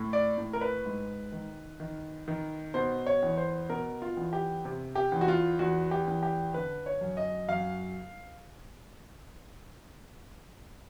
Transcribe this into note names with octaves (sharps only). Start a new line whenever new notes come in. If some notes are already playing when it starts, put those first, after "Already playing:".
Already playing: A2
D5
A2
A#4
B4
G#2
D#3
D#3
D#3
B2 C5
C#5
E2
C5
B2 A#4
F4
E2
G4
C3
G4
E2
F#4
F4
E2 F#4
G4
E2
G4
D3 B4
C#5
F#2
D#5
F#2 F5